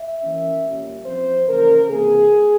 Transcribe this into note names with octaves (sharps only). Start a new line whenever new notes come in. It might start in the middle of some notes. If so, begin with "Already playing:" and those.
Already playing: E5
E3 A#3 C#4
A#2 G3 A#3 C#4
F3 C4 C5
C#3 E3 A#3 C#4 A#4
C3 E3 A#3 G#4